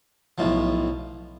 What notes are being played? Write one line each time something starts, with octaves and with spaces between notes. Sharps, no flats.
B1 A2 F3